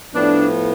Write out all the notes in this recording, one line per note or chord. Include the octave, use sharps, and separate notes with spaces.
A2 F3 B3 D4